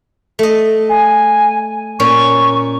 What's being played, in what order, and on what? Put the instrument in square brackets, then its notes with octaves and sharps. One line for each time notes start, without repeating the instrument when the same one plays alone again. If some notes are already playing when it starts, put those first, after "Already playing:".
[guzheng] A3 D#5
[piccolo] G#5
[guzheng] A#2 C#4 [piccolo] C#6